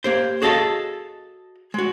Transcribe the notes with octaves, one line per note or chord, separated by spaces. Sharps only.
A#3 G4 C5
F#4 G#4 A4 D#5 F5 A5
G#3 F#4